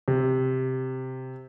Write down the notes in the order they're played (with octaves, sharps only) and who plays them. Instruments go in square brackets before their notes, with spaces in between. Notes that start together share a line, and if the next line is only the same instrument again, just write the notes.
[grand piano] C3